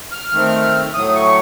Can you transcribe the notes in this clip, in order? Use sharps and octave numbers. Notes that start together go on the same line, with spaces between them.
F6
D#3 A3 C4
A2 F#3 A3 D#6
C#6